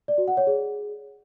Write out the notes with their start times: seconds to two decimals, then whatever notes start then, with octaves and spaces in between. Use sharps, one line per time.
0.08 D5
0.18 F#4
0.28 F#5
0.37 C#5
0.47 G#4